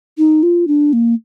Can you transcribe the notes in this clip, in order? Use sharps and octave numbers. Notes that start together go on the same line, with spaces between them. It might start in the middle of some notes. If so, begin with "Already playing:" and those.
D#4
F4
D4
A#3